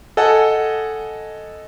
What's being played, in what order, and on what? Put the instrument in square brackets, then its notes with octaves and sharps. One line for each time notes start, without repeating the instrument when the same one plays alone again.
[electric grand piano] A4 D#5 F#5 G#5 A5